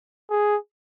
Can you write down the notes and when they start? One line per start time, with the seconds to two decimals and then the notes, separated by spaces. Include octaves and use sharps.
0.31 G#4